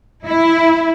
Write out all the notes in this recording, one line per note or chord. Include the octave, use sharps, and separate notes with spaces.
E4